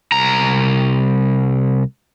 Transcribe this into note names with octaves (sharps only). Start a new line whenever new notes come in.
C2 A#5